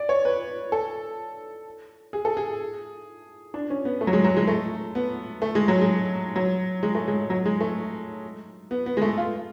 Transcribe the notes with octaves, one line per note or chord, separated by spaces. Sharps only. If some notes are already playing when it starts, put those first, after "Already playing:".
Already playing: D5
C#5
B4
A4
G#4
A4
G#4
D4
C#4
B3
A3
F#3
G#3
F#3
G#3
A3
B3
A3
G#3
F#3
G#3
F#3
G#3
A3
G#3
F#3
G#3
A3
B3
B3
G#3
A3
F4